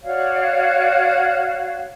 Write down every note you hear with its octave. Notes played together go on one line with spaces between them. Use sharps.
F#4 C#5 D5 F5